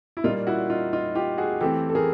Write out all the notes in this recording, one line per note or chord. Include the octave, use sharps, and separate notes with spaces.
E4
A#2 G3 A#3 D#4 F4
E4 F#4
D#4 F4
D#4 F4
F4 G4
F#4 G#4
E3 A3 C4 G4 A4
A4
G#4 A#4